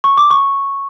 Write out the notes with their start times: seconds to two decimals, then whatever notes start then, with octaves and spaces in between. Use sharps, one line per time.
0.04 C#6
0.17 D6
0.31 C#6